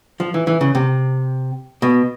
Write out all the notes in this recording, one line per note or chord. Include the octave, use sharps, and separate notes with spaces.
F3
E3
E3
C#3
C3
B2